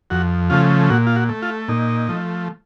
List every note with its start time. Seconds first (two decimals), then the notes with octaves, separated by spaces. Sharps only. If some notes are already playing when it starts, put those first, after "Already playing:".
0.10 F2 F#4
0.50 C#3 F3 A3 F4
0.90 A#2 F#4
1.07 F4
1.16 F#4
1.29 A3
1.42 F4
1.68 A#2 D#4
2.09 F3 A3